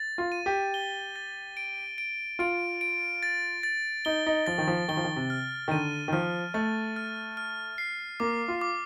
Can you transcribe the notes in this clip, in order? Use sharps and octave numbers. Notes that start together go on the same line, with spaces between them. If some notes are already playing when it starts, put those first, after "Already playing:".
Already playing: A6
F4
D#7
G4
G7
A6
D7
D7
F4 D7
D7
A6
A6
D#4 G7
D#4
F3 A6
D#3
F3
D#3 G7
F3
D#3
C3
F6
D#3
D3 D#7
D#3
F3 F6
A3 A6
F6
F6
C7
A#3 D6
F4
D6